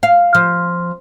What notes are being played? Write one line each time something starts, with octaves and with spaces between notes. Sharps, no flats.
F5
F3